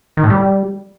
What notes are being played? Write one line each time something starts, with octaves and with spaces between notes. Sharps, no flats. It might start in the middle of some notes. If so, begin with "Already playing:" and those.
D#3
A2
G3